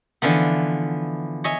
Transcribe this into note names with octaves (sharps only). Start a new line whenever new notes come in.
D3 E3 F3 B3
C#5 D#5 E5 G#5